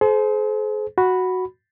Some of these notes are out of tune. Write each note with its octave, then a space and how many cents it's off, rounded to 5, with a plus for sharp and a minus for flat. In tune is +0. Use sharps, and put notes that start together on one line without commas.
G#4 +45 C5 -15
F#4 +0 B5 +0